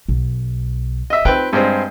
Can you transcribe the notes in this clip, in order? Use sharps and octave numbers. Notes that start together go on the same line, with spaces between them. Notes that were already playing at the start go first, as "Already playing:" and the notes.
B1
D#5 E5
C4 D#4 F4 B4 G5
G2 G#3 C4